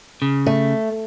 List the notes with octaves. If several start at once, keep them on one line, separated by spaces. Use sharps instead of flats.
C#3
A3